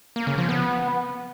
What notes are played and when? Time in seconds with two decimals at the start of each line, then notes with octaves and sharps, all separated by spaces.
0.16 A#3
0.27 C#3
0.38 F3
0.49 B3